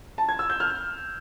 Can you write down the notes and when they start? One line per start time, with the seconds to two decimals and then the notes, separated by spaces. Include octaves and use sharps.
0.18 A5
0.29 G#6
0.39 E6
0.50 G6
0.60 F6